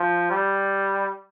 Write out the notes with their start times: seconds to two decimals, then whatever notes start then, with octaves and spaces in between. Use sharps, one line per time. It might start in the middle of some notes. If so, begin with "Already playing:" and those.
Already playing: F3
0.31 G3